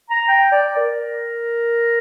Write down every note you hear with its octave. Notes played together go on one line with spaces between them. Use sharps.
A#5
G5
D5
A#4